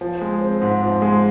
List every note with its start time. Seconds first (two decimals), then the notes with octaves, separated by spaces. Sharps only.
0.01 F3
0.22 G#3
0.41 C4
0.62 G#2
0.82 F3
1.02 G#3